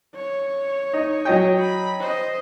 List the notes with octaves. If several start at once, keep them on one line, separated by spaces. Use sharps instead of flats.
C#5
D#4
F#3 D#5 G5
B5
C5 D#5